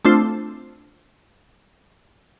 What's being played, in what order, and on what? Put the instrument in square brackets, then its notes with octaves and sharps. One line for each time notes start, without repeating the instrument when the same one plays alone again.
[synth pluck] A3 C4 D4 F4 C5